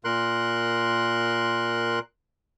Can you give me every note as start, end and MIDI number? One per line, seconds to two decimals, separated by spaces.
0.04 1.99 46
0.04 1.99 70
0.04 1.99 84
0.04 1.99 90